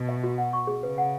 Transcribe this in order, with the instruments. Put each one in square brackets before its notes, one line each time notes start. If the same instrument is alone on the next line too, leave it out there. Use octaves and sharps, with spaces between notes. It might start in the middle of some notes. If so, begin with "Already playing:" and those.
Already playing: [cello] B2
[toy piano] E5
F#4
F#5
C#6
G#4
[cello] C#3 [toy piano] B4
[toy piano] F#5